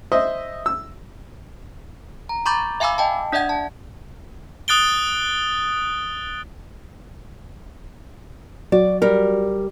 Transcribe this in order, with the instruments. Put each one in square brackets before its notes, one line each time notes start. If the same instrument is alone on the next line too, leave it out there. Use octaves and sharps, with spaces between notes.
[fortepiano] C5 D#5 E5
E6
[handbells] A#5
A#5 B5 C#6 D6 G6 A6
E5 F5 G#5 B5 D6 E6
D#5 G5 A5
D4 D5 E5 F#5 G#6
A5
[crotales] D#6 F#6 A6 D7 G7
[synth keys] F#3 F#4 [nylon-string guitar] D5
[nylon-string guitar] G3 A#4